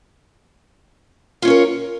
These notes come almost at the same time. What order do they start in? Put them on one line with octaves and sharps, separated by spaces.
F4 C#4 C#5 A#4